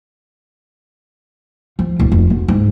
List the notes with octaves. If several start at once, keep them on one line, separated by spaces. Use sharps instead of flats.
F3
D1
F1
D2
G#2